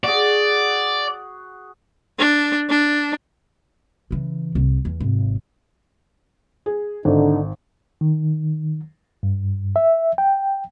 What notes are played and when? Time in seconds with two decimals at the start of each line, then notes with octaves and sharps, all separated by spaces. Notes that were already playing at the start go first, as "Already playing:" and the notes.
0.04 F#4 G#4 D5
2.18 D4
2.70 D4
4.11 C#3 E3
4.55 C2 C3
4.85 E2
5.00 G#1 C3
6.66 G#4
7.05 G#1 D3 D#4
8.01 D#3
9.23 G2
9.76 E5
10.18 G5